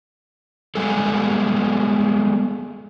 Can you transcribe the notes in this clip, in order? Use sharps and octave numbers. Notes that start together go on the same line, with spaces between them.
G3 G#3 B3 G#4 A4